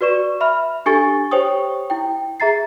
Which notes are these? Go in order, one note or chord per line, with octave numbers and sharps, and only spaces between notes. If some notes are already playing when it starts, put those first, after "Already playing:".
F#4 B4 D5 C#6 E7
E5 B5 F6
D4 G4 A4 G#5 C#6 A6
G4 C5 C#5 G5 C#6 D#6
E4 G5
G#4 E5 A#5 A6 C7